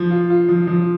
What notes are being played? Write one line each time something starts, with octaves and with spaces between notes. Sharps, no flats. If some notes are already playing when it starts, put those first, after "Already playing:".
Already playing: F3
F4
F4
F3
F3